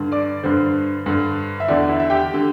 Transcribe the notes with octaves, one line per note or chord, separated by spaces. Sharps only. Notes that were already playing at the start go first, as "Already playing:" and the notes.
Already playing: G2 D3
D5 D6
G2 D3 C5
G2 D3
E5
E2 D3 D5
E4 E5
E5
G4 G5
D3